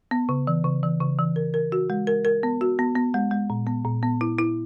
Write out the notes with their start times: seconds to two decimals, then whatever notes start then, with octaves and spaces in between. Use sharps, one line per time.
0.11 B3
0.29 C#3
0.47 E3
0.64 C#3
0.83 E3
1.01 C#3
1.19 E3
1.36 A#4
1.54 A#4
1.72 F#4
1.90 G#3
2.07 A#4
2.25 A#4
2.43 B3
2.61 F#4
2.79 B3
2.96 B3
3.14 G#3
3.31 G#3
3.50 A#2
3.67 B3
3.85 A#2
4.03 B3
4.21 E4
4.39 E4